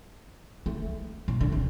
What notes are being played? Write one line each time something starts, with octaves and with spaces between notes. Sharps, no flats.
A3
A#2
D3
C3